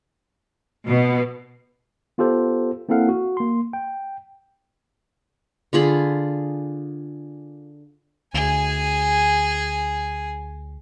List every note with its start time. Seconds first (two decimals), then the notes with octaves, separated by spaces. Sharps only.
0.87 B2
2.18 B3 F4 G4 A4 C5
2.89 A#3 C4 E4 A4 F5 F#5
3.09 F#4
3.37 A#3 C6
3.73 G5
5.73 D3 F4 G#4 B5
8.34 D2 G#4 G#5